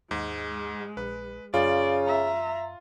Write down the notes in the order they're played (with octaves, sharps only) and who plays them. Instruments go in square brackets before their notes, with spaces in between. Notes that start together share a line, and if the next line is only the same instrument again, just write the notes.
[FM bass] D#2 [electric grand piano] G#2 [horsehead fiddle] G#3
[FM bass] A#1 [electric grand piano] B4
[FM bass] F#2 [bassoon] C#3 [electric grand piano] F4 [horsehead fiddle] D5
[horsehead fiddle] E5 A#5